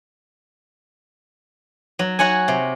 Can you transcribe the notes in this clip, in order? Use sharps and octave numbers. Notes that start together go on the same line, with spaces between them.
F#3
F#4 C#5 F#5 G#5
C3